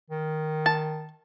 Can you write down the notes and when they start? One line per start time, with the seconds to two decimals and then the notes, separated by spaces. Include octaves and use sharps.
0.11 D#3
0.66 A5